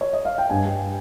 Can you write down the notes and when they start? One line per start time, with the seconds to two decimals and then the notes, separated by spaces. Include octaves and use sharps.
0.01 C#5
0.13 D#5
0.25 F5
0.38 G5
0.50 G2 G#5
0.65 G3